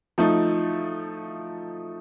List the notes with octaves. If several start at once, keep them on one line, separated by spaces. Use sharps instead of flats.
F3 A3 D#4